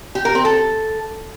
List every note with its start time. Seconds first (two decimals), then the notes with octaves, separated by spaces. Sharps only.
0.15 G4
0.25 A#4
0.35 C4
0.45 A4